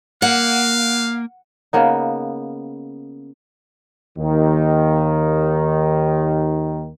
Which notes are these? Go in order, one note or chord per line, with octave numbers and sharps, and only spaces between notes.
A#3 F5 F#5
C#3 A#3 B3 D#4
D#2 D#3